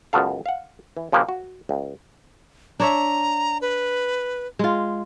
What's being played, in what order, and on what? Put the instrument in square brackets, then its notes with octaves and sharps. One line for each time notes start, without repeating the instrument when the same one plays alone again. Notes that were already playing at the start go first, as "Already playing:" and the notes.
[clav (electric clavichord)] C#2 F#2 B3 F#4 A4 F5
F5 F#5
E3
C#3 F3 A#3 G4 G#4 B4
F#4
C#2
[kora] D4 C#5 E5 [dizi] A#5
[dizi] B4
[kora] G#3 F4